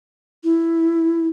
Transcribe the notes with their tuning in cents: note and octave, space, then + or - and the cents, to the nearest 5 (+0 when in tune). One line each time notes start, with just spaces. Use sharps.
E4 +5